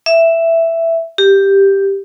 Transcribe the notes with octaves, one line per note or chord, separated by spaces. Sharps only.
E5
G4